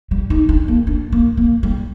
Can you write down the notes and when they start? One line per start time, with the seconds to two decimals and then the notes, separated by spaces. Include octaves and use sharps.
0.11 G3
0.30 D#4
0.49 D4
0.68 A#3
0.87 D4
1.12 A#3
1.37 A#3
1.63 G3